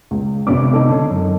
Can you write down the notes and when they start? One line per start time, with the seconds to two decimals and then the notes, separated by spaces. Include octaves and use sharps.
0.11 C#2
0.47 G#1 C3 B3 C#4 D4 D6
0.73 D#4 A4
0.90 D3 C#4
1.10 F#2